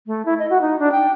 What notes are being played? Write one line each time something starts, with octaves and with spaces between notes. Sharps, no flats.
A3
E4
D#5
F#4
D#4
D4
G5